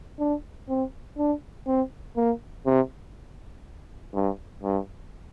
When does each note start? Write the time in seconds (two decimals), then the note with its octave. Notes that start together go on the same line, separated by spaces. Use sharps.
0.19 D4
0.69 C4
1.18 D4
1.67 C4
2.17 A#3
2.66 C3
4.14 G2
4.63 G2